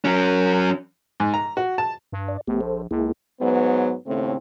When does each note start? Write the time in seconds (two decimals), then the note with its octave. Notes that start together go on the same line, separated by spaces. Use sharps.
0.05 F#3 C#4
1.20 G#2
1.34 A#5
1.57 F#4
1.78 A5
2.12 G2
2.28 D5
2.47 A#1 A3 B3 G4
2.61 A4 C5
2.91 C#2 A#3 E4 G#4
3.41 G#2 F#3 B3
4.07 D#2 A2 C#3 A3 C4